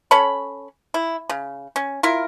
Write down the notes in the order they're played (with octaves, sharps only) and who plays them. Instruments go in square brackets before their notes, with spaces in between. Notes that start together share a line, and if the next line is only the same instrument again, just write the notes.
[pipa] C#4 A4 C#5 B5
E4
C#3
C#4
E4 F4 A#4